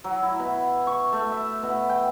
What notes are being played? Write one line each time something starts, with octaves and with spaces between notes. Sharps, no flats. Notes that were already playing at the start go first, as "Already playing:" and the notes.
F#3
E4
B2
C#6
A3
E5
B2
G5